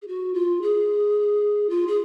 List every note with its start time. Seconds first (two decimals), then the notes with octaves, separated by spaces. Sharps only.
0.02 G#4
0.08 F#4
0.34 F4
0.62 G#4
1.70 F4
1.87 G#4